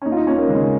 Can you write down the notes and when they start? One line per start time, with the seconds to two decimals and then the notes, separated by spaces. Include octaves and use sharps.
0.02 C#4
0.05 D#2 D#4
0.12 F4
0.17 D#4
0.27 D#2 C#4
0.38 A#3
0.49 C#3 G#3